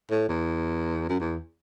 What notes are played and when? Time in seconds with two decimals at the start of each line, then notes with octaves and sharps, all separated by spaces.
0.10 A2
0.29 E2
1.09 F#2
1.20 E2